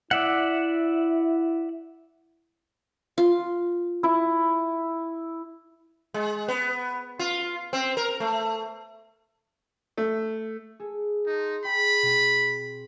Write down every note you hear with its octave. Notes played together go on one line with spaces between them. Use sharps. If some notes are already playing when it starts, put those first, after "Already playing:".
E4 D5 E5 F#5
F4
E4
G#3
B3
F4
C4
A#4
A3
A3
G#4 A4
D#4 A5 C6
G#4 C5 G5 B5
B2 C4